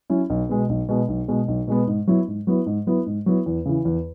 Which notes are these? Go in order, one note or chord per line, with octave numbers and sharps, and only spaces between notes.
F#3 C#4 E4
B1
B2 G#3 B3
B1
B2 G#3 B3
B1
B2 G#3 B3
B1
B2 G#3 B3
G#2
F#3 B3 E4
G#2
F#3 B3 E4
G#2
F#3 B3 E4
G#2
F#3 B3 E4
E2
C#3 E3
E2